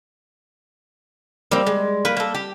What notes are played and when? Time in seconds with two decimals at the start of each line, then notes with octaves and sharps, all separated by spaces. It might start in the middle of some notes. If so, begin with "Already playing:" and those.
1.51 G3 A#3 C4
1.67 G#3
2.05 A#3 B4
2.17 A#3 A4
2.35 G4